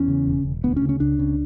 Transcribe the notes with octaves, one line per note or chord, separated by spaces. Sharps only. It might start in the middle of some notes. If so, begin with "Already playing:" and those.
Already playing: E2 C#4
C#3
E1
E1
D2 B3
C#4
C#3
C#4
C#2 D4
C#3